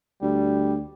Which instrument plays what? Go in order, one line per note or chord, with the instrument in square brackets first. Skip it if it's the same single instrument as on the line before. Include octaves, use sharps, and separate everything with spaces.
[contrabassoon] D2 [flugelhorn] G3